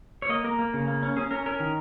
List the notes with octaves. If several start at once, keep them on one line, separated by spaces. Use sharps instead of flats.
C#5
A#3 D#5
A#3 A#4
A#3
C#3
A#3
C#4
C#4 G#4
C#4 A#4
C#4 A#4
D#3